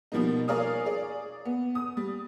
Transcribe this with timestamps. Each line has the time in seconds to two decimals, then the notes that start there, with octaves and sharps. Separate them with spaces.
0.12 B2 F3 G3 A#3 D#4
0.48 A#4 C#5 D5 F5 G#5 D#6
0.85 G#4 D5
1.45 B3
1.75 D#6
1.97 G3